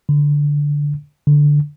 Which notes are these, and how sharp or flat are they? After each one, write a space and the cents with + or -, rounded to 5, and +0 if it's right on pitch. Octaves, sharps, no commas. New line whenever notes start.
D3 -10
D3 -5